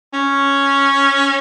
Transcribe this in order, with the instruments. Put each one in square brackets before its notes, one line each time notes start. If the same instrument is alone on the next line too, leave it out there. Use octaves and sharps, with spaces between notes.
[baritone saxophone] C#4